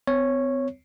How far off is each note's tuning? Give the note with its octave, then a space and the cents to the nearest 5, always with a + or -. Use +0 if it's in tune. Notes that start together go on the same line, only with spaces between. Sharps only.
C4 -45 C#5 -5